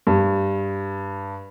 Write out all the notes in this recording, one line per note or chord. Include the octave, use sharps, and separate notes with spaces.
G2